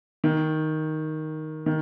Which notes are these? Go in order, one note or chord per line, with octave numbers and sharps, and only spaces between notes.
D#3
D#3